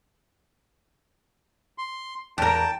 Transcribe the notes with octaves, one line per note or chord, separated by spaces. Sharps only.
C6
E2 A#4 G5 A5